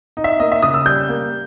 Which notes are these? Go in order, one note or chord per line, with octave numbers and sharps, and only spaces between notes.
D#4
E5
A#3 D#5
E5
C#3 D#6
E6
G3 G6
A#3